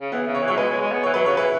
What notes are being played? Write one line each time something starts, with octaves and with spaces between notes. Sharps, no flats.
C#3
E3 B3
C#3
C#5
E3
F#3 C#5
G#3 B4
G#3
G#3
B3
E3 C#5
F#3 B4
C#3 C#5
E3 B4